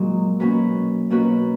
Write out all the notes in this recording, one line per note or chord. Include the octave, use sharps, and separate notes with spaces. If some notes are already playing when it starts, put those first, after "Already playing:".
Already playing: A#2 F#3 G#3 D#4
B2 A#3 C#4 F#4 B4
B2 A#3 C#4 F#4 B4